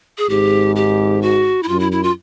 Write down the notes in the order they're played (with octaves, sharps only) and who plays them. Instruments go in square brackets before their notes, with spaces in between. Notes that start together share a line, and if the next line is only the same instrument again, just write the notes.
[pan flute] G#4
[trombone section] G#1 G#2 [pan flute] G4
[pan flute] G4
F#4
E4
[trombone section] F#2 [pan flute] F4
[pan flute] E4
E4
F4